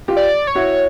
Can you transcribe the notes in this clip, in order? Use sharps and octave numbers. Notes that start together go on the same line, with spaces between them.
F4 G4
D5
C#5
E4 F#4